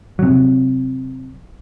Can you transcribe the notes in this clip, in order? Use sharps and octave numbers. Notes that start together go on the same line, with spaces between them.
C3 F#3